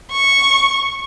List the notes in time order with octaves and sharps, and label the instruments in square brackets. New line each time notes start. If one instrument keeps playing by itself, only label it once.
[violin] C#6